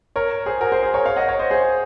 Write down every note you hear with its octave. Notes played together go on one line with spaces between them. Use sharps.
A#4 C#5
G#4 C5
F#4 A#4
G#4 C5
G#4 C5
A#4 C#5
C#5 F5
D#5 F#5
C#5 F5
C5 D#5
G#4 C5